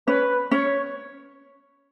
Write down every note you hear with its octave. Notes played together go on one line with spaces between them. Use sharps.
C#4 B4
C#4 C#5